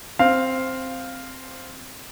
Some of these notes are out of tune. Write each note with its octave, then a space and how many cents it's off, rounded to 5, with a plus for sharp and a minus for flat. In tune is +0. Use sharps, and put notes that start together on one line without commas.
C4 +0 F5 +0